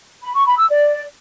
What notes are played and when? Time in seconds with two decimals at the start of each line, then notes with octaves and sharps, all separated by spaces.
0.23 B5
0.35 C#6
0.46 B5
0.58 E6
0.69 D5